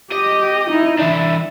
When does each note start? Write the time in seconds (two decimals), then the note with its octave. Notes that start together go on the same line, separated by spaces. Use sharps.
0.12 G4 D#5
0.69 D#4 E4
0.99 E3 D4 E5